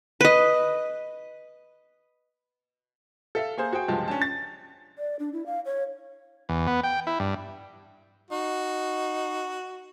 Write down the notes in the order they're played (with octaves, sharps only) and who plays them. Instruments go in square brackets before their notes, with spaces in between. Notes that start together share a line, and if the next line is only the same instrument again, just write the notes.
[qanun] B4 D#5
[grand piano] A4 E5 F5
A#3 G#4 C5
F#4 G#4 C5 G5
C#2 G2 F3 G#3 G4 A5
C#4 D4 A5
A6
[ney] D5
D4
E4
F5
C#5
[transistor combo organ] E2
B3
G5
E4
G2
[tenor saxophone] D#4 [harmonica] F#4